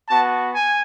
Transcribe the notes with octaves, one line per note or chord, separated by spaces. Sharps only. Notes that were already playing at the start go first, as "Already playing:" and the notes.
B3 F#4 A5
G#5